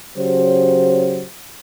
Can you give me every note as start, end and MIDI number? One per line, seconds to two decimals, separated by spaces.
0.17 1.23 49
0.17 1.23 54
0.17 1.23 61
0.17 1.23 67
0.17 1.23 72